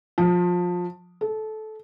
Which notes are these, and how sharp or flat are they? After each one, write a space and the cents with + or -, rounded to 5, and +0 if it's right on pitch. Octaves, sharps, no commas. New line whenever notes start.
F3 +25
A4 -20